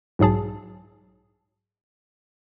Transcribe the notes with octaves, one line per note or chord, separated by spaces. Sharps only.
B1 G#2 F#3 G#4 A5